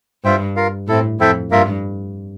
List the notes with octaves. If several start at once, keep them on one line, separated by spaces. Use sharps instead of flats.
G2 F4 C5 E5 G5
F4 A#4 F5
A2 C4 E4 A4
F2 C4 E4 A4 E5 G5
G2 A#3 F4 A#4 E5